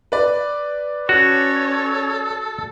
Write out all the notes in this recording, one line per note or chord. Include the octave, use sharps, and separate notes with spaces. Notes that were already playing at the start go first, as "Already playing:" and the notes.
B4 D5
C#4 F#4 A4 C#5